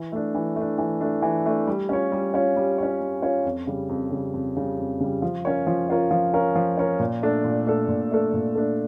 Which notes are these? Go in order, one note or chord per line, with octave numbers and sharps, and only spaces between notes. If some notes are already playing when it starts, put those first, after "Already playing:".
Already playing: E3
A3 D4
E3
A3 D4
E3
A3 D4
E3
A3 D4
G3
C#4 F4 C#5
G3
C#4 F4 C#5
G3
C#4 F4 C#5
G3
C#4 F4 C#5
F2
C#3 G3
F2
C#3 G3
F2
C#3 G3
F2
C#3 G3
F3
C#4 F4 A#4 C#5
F3
C#4 F4 A#4 C#5
F3
C#4 F4 A#4 C#5
F3
C#4 F4 A#4 C#5
A#2
A3 D4 A4
A#2
A3 D4 A4
A#2
A3 D4 A4
A#2
A3 D4 A4